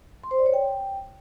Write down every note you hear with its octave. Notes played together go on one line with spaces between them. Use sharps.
C6
C5
D5
C#5
G5